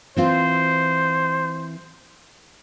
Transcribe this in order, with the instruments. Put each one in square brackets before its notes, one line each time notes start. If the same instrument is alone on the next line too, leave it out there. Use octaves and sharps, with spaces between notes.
[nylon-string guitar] E3 C4 F4 [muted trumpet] C5